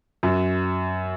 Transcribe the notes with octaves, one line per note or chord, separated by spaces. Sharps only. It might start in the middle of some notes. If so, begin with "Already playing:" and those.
F#2